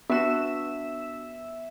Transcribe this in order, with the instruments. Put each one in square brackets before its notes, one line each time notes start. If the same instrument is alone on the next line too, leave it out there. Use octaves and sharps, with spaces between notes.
[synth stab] B3 E7 [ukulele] D4 F#4 [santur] E5